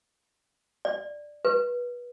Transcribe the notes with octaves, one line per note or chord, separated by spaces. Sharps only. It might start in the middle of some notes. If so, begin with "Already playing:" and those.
D5
B4